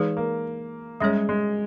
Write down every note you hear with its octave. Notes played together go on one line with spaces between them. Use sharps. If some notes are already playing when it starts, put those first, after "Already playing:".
Already playing: E3 G#3 D#4 G#4 B4
A#3
G3 G#3 C#4 G#4 C#5
G#3